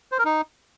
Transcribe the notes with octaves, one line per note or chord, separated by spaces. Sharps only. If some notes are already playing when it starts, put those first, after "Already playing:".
C5
A#4
D#4